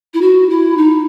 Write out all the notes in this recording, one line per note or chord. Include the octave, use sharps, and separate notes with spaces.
E4
F#4
E4
D#4